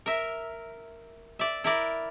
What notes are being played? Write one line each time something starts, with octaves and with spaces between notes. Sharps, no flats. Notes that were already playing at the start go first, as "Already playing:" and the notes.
A#4 E5
D5 E5
E4 A#4 D5